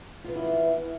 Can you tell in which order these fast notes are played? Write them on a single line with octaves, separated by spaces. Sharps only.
F4 B3 E3 E4